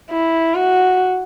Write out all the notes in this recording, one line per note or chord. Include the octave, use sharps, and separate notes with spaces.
E4
F#4